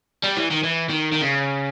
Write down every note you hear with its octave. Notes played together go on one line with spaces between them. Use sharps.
G3
E3
D#3
E3
D#3
D#3
C#3